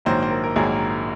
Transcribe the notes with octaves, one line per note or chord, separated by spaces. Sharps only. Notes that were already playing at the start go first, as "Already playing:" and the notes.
A#1 G#2 D#3 F#3 A#3 C5
C5
A#4
A#4
A#1 G#2 D#3 F#3 A#3 G#4